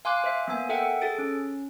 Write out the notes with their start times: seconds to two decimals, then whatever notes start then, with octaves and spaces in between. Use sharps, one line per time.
0.05 F5 G#5 C6 D6 F#6
0.24 C5 E5
0.48 A#3 B3 G#5
0.69 A4 A#4 E5 F#5 G5
1.01 G#4 A4 A6 D7
1.18 C#4